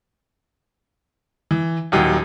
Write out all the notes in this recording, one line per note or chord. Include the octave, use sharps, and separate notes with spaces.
E3
D#1 D#2 F#3